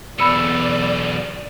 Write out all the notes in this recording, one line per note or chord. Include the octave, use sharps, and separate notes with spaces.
B1 E2 D5 B5 E6 C#7